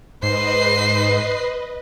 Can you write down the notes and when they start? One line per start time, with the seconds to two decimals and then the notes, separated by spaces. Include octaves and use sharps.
0.23 G#2 B4 C5 D#5 C7